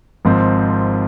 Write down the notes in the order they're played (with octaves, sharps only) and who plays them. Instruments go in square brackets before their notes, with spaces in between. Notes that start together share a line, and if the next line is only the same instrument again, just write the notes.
[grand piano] G#1 G#2 F3 C4